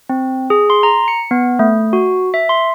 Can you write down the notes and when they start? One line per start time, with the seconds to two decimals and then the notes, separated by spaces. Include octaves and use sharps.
0.09 C4
0.50 G#4
0.70 C6
0.83 A#5
1.08 C#7
1.31 B3
1.59 A3
1.93 F#4
2.34 E5
2.49 C6